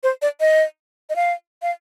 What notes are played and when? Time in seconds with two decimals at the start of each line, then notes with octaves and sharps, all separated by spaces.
0.03 C5
0.22 D5
0.40 D#5
1.10 D#5
1.16 F5
1.62 F5